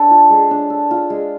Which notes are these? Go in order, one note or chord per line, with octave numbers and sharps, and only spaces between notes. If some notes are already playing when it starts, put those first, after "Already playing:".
Already playing: D4 A4
F4
G#3
D4
A4
F4
G#3